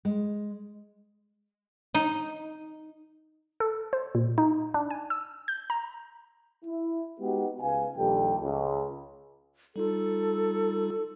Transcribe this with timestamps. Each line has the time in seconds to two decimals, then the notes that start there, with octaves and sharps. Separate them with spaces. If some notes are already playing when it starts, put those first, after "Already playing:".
0.05 G#3
1.94 D#4
3.60 A4
3.93 C5
4.15 A#2
4.38 D#4
4.74 D4
4.90 G#5
5.10 E6
5.48 G6
5.70 A#5
6.64 E4
7.20 G#3 B3 D#4 F#4 G4
7.61 C#2 B4 F5 G#5
7.97 A#1 D#2 G3 G4 A4 G5
8.40 C#2
9.76 G3 D#4 F4 A4